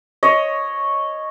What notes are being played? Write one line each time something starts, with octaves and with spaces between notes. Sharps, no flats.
C#5 D#5